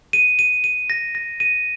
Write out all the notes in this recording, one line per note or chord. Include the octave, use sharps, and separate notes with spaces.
D#7
D#7
D#7
A#6
A#6
D#7